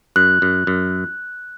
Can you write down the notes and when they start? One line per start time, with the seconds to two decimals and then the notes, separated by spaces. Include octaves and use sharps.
0.16 F#2 F#6
0.42 F#2
0.67 F#2